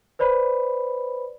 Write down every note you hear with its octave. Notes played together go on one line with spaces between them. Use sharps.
B4 C5 D5 B5